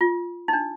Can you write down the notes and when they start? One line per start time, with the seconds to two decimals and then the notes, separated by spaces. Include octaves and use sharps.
0.01 F4
0.48 D#4
0.53 D4